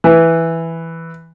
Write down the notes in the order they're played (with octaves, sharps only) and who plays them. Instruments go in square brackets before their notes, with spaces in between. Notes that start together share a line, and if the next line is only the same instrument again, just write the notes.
[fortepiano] E3